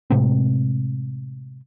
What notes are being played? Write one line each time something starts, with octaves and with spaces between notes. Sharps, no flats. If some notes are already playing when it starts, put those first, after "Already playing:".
A2 C3 G#3 C4